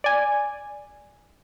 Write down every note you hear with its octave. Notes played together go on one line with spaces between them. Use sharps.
D5 G#5